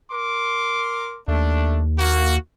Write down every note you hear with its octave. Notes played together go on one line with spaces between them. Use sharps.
A#4 C6 D6
D#2 A3 D4
A#3 F#4